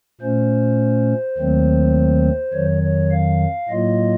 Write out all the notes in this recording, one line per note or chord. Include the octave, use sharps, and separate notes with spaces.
A#2 A3 C#4 C5
D#2 D#3 F#3 A3 C4
F2 D#3 F#3 C#5
C#5
F5
A2 F#3 A#3 F4 D#5